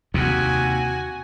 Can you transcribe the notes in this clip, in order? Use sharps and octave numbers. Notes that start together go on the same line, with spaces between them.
D#2 C3 F#4 G#5